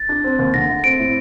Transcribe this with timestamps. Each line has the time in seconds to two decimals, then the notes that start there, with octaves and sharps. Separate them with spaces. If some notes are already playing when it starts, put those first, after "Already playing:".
Already playing: A6
0.09 D4
0.24 C4
0.39 D#2
0.54 D3 A#6
0.69 A3
0.84 C4 D7
0.99 A2